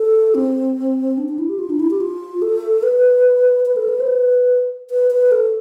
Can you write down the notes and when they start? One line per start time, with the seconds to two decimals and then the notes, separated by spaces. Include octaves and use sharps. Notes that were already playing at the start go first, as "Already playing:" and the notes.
Already playing: A4
0.35 C4
1.18 D4
1.28 D4
1.39 E4
1.49 G4
1.59 F4
1.70 D4
1.80 E4
1.90 G4
2.01 F4
2.42 A4
2.83 B4
3.66 B4
3.76 A4
3.88 B4
4.00 C5
4.07 B4
4.90 B4
5.11 B4
5.31 A4